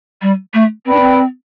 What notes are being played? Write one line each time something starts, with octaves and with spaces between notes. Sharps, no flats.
G3
A3
C4 B4 D5 G5 B5
D4
C4